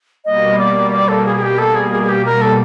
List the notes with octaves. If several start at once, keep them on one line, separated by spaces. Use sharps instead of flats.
B2 G3 A#3 D#5
D5
D5
A4
G#4
G#4
G4
A4
G#4
G#4
G#4
G4
A#4
A4